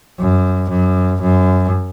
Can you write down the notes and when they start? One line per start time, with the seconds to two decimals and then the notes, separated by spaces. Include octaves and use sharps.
0.19 F#2
0.70 F#2
1.22 F#2